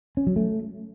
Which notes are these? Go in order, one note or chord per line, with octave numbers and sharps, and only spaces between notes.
C#4
F#3
A3